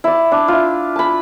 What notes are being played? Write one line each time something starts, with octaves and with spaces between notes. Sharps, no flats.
E4 D5
D4
E4 F4
A5 B5